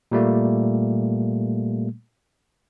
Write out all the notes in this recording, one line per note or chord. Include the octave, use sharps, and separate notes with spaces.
A#2 G3 A3 A#3